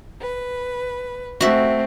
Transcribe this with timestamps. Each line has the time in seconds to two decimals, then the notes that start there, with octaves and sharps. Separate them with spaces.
0.20 B4
1.41 A3 C4 F#4 E5